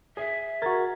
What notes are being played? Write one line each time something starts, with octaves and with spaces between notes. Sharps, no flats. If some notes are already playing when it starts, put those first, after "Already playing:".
G#4 E5
F#4 A#4 A#5 G#6 A6